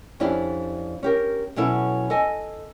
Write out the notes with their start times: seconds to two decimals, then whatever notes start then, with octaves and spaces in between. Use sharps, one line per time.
0.20 F2 C#4 D4 E4 G4
1.03 C#4 G4 A#4
1.56 B2 F#3 C#4 E4 A4
2.10 A4 D#5 G#5